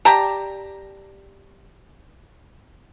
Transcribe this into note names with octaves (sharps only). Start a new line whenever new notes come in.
G4 D5 A5 A#5